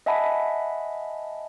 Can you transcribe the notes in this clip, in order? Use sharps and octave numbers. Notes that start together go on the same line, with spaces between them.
D#5 E5 F#5 G#5 A5 B5